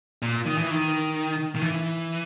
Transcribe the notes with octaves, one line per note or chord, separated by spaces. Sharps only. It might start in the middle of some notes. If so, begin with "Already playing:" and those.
A#2
D#3
E3
D#3
D#3
E3